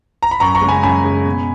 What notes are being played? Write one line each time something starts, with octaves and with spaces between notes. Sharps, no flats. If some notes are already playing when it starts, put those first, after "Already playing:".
A#5
B5
F#2 A#5 C#6
A#5 C#6
C#3 G#3
G#5 B5
F#2 G#5 B5
C#3 G#3
B2